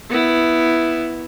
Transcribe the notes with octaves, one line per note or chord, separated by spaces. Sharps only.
B3 E4